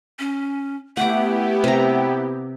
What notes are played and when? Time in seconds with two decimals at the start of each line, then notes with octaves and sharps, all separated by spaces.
0.19 C#4
0.97 A3 B3 E4 G4 F#5 D6
1.64 C3 A#5